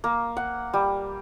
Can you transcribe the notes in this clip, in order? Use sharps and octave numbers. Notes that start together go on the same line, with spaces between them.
A#3
F#5
G3